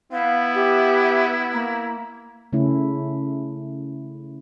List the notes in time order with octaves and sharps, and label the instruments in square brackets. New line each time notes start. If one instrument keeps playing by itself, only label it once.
[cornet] B3 [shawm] E4 [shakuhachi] F5
[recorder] G4 [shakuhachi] E5
[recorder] A#3 [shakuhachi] A#5
[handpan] C#3 A3 C#4 E4